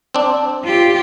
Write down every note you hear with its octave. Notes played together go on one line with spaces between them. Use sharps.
C4 D4
F4 G4